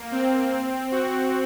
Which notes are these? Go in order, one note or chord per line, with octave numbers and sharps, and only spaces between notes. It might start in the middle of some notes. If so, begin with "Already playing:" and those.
Already playing: A#3
C4
F#4